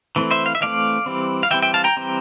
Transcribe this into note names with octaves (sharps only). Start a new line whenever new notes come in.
E3 A3 C4
C5 E5
F5
E5
E3 A3 C4 D5 F5
E3 G3 C4
F5
E3 G3 C4 E5 G5
E5 G5
F5 A5
G5 A#5
E3 G3 C4